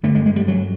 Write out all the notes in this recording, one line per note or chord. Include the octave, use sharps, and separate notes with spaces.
G2 D3 A3
G#3
G#3
G3
F#3